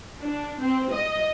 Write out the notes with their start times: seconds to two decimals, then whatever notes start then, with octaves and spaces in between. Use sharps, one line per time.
0.19 D4
0.60 C4
0.91 D#5